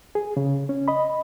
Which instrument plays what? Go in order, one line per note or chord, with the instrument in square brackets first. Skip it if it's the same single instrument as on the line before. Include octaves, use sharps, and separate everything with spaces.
[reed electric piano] G#4
C#3
C#4
D#5 B5